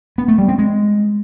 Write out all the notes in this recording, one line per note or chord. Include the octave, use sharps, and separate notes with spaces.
B3
A3
G3
C4
G#3